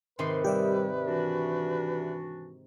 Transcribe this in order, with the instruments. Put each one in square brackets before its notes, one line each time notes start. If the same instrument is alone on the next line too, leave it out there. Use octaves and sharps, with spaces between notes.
[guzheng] G#2 C3 D#3 [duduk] B4 [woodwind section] C6
[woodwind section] G3 [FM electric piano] G4 D5 E5
[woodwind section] E3 D4 F#4